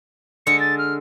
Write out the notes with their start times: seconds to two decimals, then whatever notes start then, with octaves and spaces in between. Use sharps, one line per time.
0.47 D3 G#3 C#7
0.60 A6
0.78 F6